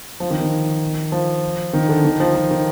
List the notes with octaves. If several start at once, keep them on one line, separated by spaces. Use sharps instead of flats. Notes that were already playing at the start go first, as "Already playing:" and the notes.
F3
D#3
D#3
F3
D#3
D3
D#3
F3
F3
D#3